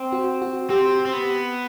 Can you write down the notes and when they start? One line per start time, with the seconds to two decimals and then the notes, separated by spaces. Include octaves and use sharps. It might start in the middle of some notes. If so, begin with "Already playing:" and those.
Already playing: C4
0.12 F#4
0.42 F#4
0.70 C4 G4
1.05 C4
1.13 B3